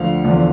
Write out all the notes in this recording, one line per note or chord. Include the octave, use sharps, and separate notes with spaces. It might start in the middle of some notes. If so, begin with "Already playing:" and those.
Already playing: D2 D3 F3 F5
E2 D3 F3